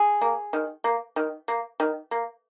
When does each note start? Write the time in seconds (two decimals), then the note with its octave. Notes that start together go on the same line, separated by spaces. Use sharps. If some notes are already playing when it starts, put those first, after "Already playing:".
Already playing: G#4
0.21 A#3
0.53 D#3
0.84 A#3
1.16 D#3
1.48 A#3
1.80 D#3
2.11 A#3